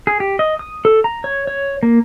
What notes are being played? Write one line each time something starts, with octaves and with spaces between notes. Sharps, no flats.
G#4
G4
D#5
D#6
A4
A#5
C#5
C#5
A#3